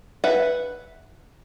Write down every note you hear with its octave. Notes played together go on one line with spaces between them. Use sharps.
B4 E5 F#5